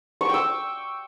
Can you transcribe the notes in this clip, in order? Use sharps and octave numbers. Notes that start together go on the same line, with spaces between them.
G5 C#6 D6 E6